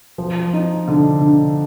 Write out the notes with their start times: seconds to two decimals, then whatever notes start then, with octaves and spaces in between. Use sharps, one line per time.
0.18 F3
0.53 D#4
0.88 D3
1.21 D3